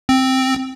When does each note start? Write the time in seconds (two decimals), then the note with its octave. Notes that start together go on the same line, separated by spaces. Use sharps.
0.09 C4